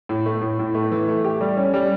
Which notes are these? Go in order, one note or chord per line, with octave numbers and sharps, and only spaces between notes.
A2
A3
A2
A2
A3
E3
A3
G4
G3
C#4
G3